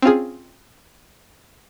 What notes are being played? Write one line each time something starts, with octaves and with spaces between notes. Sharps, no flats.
C4 C#4 F4 G#4